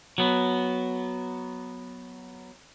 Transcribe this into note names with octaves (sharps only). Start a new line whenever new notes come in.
F#3 B3